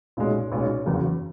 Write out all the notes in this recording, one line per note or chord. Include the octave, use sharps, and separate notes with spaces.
B1 A#2 G#3 C#4
B1 A#2 G#3 C#4
F#1 E2 C#3 F#3 A#3